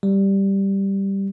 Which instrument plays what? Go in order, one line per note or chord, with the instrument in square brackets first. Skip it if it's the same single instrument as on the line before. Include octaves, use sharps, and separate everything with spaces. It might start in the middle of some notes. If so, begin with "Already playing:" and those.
[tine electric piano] G3